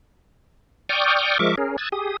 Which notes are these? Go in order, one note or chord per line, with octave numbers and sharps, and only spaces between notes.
D5 G5 C#6 D#6 F6 G6
F3 G#3 A#4 E5 C#6 D6
C#4 G#4 A#4
D#6 E6 F#6 G#6 A6
G4 G#4 D#6